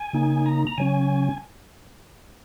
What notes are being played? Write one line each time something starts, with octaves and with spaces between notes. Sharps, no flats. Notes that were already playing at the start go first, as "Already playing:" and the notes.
Already playing: G#5
C#3 A#3 D#4
A#5
A#5
C#3 F#3 C#4 G#5